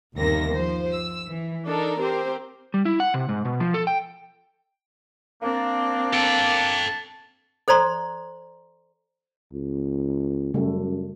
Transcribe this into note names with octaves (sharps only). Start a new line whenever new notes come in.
G1 D#2 C3 A#3 A#6
F3 C5
E6
E3
D4 D#4 A4 A#4
C4 G4 A#4 C5
G3
E4
F#5
C3
G#2
B2
F3
A4
G5
A#3 C4 D4
A4 G5 A5
A4 C5 D5 A#5 C6
C#2
F#2 C#3 G3 A3